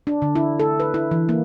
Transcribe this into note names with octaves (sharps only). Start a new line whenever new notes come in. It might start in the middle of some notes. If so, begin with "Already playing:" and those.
D4
D3
E4
A4
B4
E4
E3
A#3